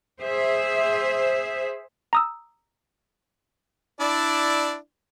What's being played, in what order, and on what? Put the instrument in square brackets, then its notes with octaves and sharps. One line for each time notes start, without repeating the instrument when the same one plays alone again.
[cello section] G#4 C5 E5
[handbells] A#5 D#6 E6
[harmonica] D4 E4 D5